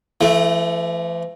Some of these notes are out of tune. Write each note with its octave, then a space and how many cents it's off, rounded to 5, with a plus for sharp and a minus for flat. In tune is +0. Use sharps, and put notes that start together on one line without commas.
E3 +45 A3 -5